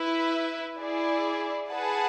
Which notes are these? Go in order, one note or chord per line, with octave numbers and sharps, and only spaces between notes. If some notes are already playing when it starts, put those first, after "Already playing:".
Already playing: E4 B4 E5
E4 G#4 D5
G#4 B4 F#5 A5